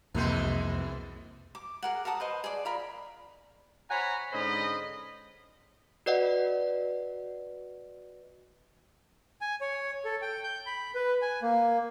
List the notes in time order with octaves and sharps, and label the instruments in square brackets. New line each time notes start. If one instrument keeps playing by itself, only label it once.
[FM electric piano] C2 C5 [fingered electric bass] F2 A#3 [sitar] B2 E3 G#3
[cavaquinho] D6
G#4 A#4 F#5
A#4 F#5 A5 D#6
B4 C5 D#5
G#4 D5
F4 A#4 B5
[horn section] C5 C#5 F#5 G#5 A#5 B5
G#2 D3 C#4 C5 D#5 B5
[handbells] F#4 B4 D5 D#5 F#5
[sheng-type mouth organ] G#5
C#5
A4
G5
G6
B5
B4
G#5
A#3